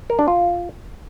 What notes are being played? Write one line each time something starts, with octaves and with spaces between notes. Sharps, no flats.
A#4
D4
F4